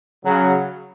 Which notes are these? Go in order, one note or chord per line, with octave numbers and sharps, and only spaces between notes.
C#3 F#3